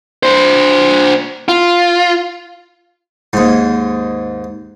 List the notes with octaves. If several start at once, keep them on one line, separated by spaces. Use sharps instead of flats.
D4 C5
F4
D#2 G#2